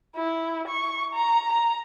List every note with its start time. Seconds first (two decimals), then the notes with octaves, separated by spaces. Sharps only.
0.16 E4
0.68 C#6
1.14 A#5
1.53 A#5